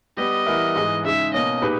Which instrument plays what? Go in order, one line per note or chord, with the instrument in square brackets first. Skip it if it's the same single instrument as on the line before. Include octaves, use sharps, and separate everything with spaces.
[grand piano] G3 B3 G4 [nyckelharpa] D#5
[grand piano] E3 G3 B3 E4 A#4
G#2 E3 G#3
[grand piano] C#3 G#3 D#4 [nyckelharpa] E5
[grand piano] B2 A#3 C#4 [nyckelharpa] D#5
[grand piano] A#2 G#3 D#4 G4 B4